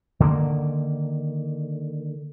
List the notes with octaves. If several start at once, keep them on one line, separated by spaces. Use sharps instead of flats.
D3 D#3 G3 A#3